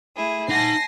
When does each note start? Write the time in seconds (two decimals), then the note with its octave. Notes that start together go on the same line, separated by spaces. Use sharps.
0.15 A3 E4 G#4
0.49 D#4 F#5 G#5 A5 A#6 C7